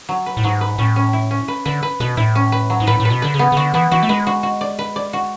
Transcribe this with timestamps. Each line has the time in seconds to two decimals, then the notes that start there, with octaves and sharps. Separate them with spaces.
0.09 F#3
0.26 B4
0.37 A2
0.44 G#2 F#3
0.61 B4
0.78 A2 C#4
0.96 C#4
1.13 E4
1.31 C#4
1.48 B4
1.65 D3 B4
1.83 B4
2.00 B2 B4
2.17 A2 E4
2.35 C#4
2.52 B4
2.70 F#3
2.80 G#2
2.87 A2 B4
3.00 A2
3.05 B4
3.10 B2
3.22 D3 B4
3.34 C#3
3.39 B3
3.52 C#3
3.57 D3 F#4
3.74 E3 B3
3.91 E3 F#4
4.03 A3
4.09 G#3 B4
4.27 F#4
4.43 F#4
4.61 D5
4.79 B4
4.96 D5
5.13 F#4